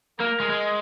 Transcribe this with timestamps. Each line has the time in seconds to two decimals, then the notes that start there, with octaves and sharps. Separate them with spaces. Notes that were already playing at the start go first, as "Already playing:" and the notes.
0.20 A#3 A#4
0.40 G#3
0.50 G#3